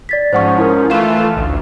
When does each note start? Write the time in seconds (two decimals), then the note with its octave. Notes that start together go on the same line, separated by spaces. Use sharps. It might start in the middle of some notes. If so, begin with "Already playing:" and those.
0.09 D5 A6 B6
0.33 G#2 F3 C#4 C5 F#5 C#6
0.58 E4 A#4
0.90 E3 A3 F4 F5 E7
1.36 A1 D2